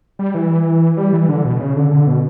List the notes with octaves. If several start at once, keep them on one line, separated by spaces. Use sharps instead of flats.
G3
E3
G3
E3
D3
B2
C#3
D3
D3
B2